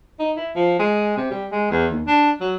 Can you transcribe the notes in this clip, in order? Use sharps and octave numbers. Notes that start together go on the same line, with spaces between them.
D#4
E4
F3
G#3
C3
G3
G#3
E2
D#2
D4
F#3